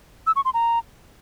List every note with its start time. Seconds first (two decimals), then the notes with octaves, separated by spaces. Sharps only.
0.27 E6
0.36 C#6
0.45 C6
0.54 A#5